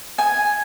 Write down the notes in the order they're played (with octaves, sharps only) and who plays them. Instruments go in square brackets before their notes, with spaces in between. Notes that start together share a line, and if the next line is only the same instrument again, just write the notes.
[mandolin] G#5